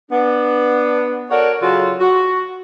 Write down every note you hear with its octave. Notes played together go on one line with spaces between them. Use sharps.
B3 D4
F#4 A4 A#4 C#5 D5 F#5
C#3 F#3 C#4 F4 F#4 A4
F#4